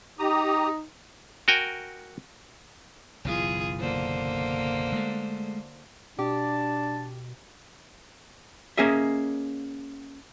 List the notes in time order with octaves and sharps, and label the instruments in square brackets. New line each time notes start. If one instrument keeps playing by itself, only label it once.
[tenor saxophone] D#4 [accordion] G4 A#5 D#6
[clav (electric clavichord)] F#4 A#4 G5 G#5
[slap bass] F#1 B1 E3 [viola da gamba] F4 G#4
[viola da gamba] D3 A#3 C5
[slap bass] G#3 A3
[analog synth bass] B2 [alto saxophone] D4 [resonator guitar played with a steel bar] G4 [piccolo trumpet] A5
[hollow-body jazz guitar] A#3 C#4 G#4 D#5 E5